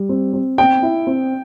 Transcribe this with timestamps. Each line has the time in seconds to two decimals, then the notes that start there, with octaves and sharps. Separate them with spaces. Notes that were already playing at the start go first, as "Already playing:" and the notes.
Already playing: G3
0.09 C4
0.33 C4
0.58 C4 G5
0.82 E4
1.07 C4